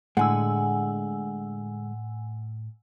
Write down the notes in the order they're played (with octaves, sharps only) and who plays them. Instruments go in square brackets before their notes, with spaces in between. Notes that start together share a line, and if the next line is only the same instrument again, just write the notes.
[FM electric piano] A2 [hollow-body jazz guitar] D3 G#3 [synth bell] F#5 G#5 E6